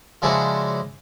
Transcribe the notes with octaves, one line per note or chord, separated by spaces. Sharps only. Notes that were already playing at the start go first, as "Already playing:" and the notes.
C#3 F3 G#3 D4 E4 F#4